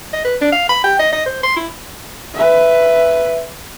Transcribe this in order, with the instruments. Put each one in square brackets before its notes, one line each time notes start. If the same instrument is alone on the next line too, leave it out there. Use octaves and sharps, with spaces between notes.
[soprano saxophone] D#5
B4
D4
F5
B5
G5
D#5
D#5
C5
C6
E4
[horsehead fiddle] B4 E5